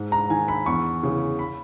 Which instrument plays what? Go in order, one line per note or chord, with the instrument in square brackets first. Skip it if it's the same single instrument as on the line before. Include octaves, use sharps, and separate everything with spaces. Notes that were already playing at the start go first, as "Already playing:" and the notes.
Already playing: [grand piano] G#2
A#5
D#3 G#5
B5
E2 C#6
C#3 E3
B5